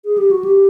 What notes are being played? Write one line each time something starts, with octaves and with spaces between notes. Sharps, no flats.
G#4
G4
F#4
G4